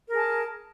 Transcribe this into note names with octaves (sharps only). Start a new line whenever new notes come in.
G#4 A#4 A5